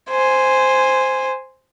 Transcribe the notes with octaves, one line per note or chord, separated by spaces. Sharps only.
C5 G#5